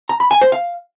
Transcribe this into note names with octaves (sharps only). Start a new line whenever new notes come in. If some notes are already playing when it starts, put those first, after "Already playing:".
A#5
B5
G#5
C5
F5